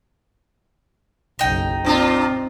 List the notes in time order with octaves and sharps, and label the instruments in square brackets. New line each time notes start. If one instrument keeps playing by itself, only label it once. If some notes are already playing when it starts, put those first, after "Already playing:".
[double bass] F#1 B1 [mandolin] D#4 G5
[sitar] A#2 D4 F4 [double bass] C4